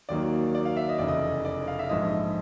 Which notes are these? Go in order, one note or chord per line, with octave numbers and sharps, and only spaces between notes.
D#2 D#3 F#3 A#3 D5
D5
F5
E5
D#5
F1 E2 C#3 D5
D#5
D5
F5
E5
A#1 G#2 F3 D#5